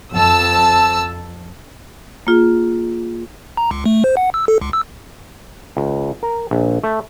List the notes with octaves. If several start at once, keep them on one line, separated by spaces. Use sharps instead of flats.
F2 A5 E6
A#3 F4 G#4
A#5
C#2
A3
C5
F#5
E6
A4
C#2
E6
C#2
A#4
A#1
A3